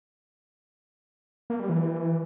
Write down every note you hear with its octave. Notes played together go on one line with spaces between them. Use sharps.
A#3
G3
E3